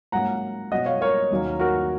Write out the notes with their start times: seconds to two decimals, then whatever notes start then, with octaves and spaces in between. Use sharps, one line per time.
0.12 G#2 F#3 A#3 C#4 F#5 A#5
0.72 B2 F#3 C#4 D#5 F#5
0.86 C#5 F5
1.01 A#4 C#5
1.31 D#2 D#3 F#3 A#3 C#4
1.60 F#4 A#4